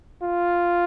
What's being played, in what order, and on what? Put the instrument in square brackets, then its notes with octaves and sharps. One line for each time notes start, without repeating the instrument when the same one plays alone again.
[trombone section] F4